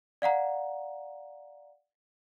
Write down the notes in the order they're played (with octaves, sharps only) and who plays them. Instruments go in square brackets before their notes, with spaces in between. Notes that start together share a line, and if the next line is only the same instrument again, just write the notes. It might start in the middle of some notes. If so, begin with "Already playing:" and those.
[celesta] D5 F5 F#5 A#5